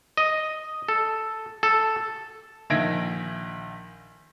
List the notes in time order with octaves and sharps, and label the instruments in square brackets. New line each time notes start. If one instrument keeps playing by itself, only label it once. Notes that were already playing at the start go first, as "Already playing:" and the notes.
[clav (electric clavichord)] D#5
A4
A4
[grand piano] A#1 D#3 E5 G#6 A#6 D7